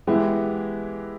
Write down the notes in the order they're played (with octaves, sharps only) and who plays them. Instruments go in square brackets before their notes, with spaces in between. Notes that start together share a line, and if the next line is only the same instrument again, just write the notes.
[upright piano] E3 G#3 B3 E4 G4